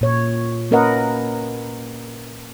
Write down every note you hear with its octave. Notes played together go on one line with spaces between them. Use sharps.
A#2 C#5
A#3 C#4 A#4 B4 D#5 F#5